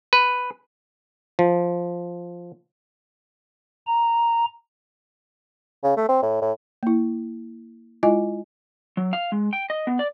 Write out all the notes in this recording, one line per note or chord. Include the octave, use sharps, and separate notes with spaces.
B4
F3
A#5
C#3
A3
C4
A2
A2
A#3 E4
G#3 E4 F4 D#5 G#5
F#3
F5
G#3
G5
D#5
B3
D5